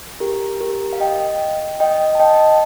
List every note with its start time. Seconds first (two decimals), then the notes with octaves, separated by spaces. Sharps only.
0.20 G4 A#4
0.61 G4 A#4
0.93 F5
1.00 D#5 G5
1.80 D#5 G5
2.15 A5
2.20 D#5 G5